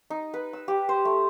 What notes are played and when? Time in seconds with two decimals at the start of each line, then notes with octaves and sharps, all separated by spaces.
0.10 D#4
0.34 B4
0.53 E6
0.68 G4
0.89 C5
1.05 A3